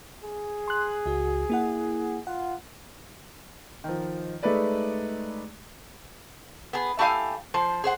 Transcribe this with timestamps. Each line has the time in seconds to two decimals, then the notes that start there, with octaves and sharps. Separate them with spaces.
0.23 G#4
0.68 C6 F#6
1.06 C#2 F#4
1.50 A#3 E4 F#5
2.27 F4 F#5
3.84 D#3 F3
4.42 G#3 A3 D#4 B4 D5
6.73 B3 G#4
6.99 A3 E4 G4 E5 F5 G#5
7.54 F3 C5
7.84 G#4 C5 F#5